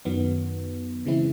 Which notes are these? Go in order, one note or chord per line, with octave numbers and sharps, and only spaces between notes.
F#2 D#3 F#3 B3
C#3 E3 G#3 C4 E4